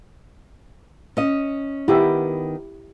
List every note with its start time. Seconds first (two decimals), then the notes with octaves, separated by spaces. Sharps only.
1.17 C#4 D#5
1.88 D#3 B3 E4 G4 E5